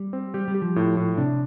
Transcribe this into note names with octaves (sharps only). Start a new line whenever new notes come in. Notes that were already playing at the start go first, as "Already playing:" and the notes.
Already playing: G3
C4
G3 G4
G3
G4
F3
A2
A2
C3 D4